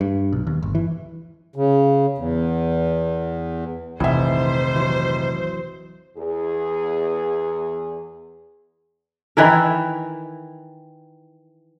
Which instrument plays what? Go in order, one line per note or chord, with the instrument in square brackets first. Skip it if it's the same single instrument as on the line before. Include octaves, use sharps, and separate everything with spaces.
[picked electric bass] G2
B1
D#2
G1
E3
[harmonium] C#3
E2
[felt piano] F1 E5 [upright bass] A#1 D#3 [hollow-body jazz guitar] E3 [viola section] C5
[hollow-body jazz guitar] E3 F#3
[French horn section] E2 G#4
[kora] D#3 E3 E4 A#4